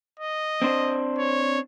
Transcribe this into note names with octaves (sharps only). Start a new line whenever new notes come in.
D#5
C4 D4 C5
C#5